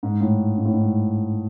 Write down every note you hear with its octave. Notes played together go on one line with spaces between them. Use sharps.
G#2
A2
G#2
A2
G#2